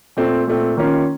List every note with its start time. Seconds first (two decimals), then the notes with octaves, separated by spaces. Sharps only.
0.17 A#2 A3 C4
0.47 A#2 A3 C4
0.77 D#3 A#3 C#4 F4 A#4